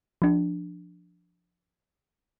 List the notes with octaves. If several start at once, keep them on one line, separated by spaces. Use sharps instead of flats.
F3 D4